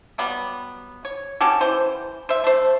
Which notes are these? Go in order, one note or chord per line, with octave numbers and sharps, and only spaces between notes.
F#3 G3 B3
C#5
C#4 F#4 G4 A4
E3 C5
C5 E5
A3 C5